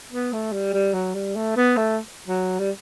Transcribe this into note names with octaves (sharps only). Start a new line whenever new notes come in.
B3
A3
G3
G3
F#3
G3
A3
B3
A3
F#3
G3